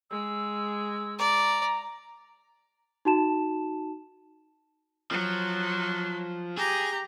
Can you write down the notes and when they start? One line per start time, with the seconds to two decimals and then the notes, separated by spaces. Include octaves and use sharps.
0.11 G#3 E6
1.19 D5 A#5
3.05 D#4 F#4 A5 E7
5.11 F3 F#3
6.57 G4 G#4 A#5